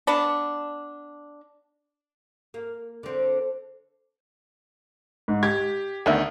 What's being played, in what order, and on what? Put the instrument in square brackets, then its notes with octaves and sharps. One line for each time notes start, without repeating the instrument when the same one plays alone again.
[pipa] B3 D4
[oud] A#3
D3 C4
[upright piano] G#2
[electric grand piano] G4 [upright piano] G#6
[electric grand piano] D2 D#3 [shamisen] D3 B3 E5